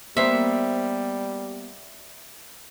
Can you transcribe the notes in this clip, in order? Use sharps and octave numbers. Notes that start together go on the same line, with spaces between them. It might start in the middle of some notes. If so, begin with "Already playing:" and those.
G3 A#3 B3 C5 E5